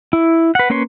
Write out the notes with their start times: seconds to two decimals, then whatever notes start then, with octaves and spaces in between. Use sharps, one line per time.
0.13 E4
0.55 B4 F#5
0.70 A#3 C#4 B4 C#5 C6